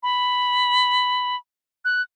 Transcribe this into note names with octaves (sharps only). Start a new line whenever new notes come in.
B5
F#6